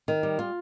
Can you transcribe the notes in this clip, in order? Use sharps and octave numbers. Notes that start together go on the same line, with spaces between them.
D#3
G3
F4